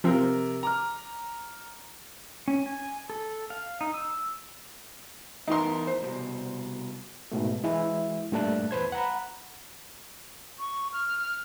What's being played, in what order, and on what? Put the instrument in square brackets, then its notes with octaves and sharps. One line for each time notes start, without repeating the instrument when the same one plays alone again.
[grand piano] C3 A#4 [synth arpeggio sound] F3 C4
[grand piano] A#5 D6 F6
[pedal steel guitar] C#4
G#5
A4
F5
D#4
E6
[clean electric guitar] E3 B3 A#4 [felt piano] D#4 C6
[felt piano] C5
[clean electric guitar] C2 B2
[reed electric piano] G#2 B2 A3
E3 G#3 E4
G2 A#2 A3 D4 A5 F#6
E2 B4 C5 G#6
F#5 A#5 B5
[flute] C#6
F6